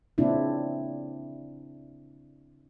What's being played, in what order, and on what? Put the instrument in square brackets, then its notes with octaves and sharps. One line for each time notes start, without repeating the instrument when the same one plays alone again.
[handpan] A#2 C#3 C4 D4 E4